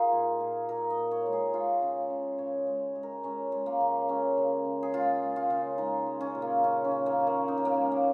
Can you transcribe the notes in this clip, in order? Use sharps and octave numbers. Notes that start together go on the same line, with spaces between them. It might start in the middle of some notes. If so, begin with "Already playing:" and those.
Already playing: D#4 F4 G#4 A#4
A#2
A#2
A#2 A#4
D#5
A#2
C#5
G#3
G#4
G#3 F4
C#3
C#3
C#3 C#5
G#3
G#3
A#4
G#3 C#4
G#3
A#3
C#3
G#3 C#4
C#3
C#3
G#4
G#3 F4
G#3
F4
C#3
G#3 D#4
G#3
C#4
A#2
A#3
C#3 C#4
C#4
C#3
A#3
C#3
A#3
C#3 D#4
C#4
A#3
G#3 C#4
A#3